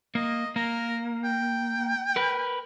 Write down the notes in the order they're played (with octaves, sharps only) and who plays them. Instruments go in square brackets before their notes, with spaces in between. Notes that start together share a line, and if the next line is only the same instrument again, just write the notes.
[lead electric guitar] A#3 [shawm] D#5
[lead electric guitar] A#3 [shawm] A#4
[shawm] G5
[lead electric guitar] A#4 B4